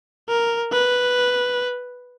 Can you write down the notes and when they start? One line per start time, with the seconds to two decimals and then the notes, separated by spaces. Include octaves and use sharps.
0.29 A#4
0.72 B4